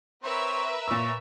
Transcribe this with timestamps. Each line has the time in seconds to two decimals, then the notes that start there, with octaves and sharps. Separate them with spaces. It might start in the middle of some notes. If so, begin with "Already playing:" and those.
0.24 C4 A#4 B4 C#5 E5
0.88 A#2 C#5 E6